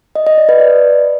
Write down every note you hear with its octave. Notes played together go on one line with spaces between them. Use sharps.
D#5
D#5
D5
B4
D5